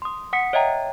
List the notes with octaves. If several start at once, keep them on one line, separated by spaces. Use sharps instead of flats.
C6 D#6
F#5 D#6 B6 C#7
C#5 D#5 E5 G5 A#5